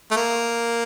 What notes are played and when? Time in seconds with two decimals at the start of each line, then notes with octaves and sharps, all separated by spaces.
0.11 A3
0.16 A#3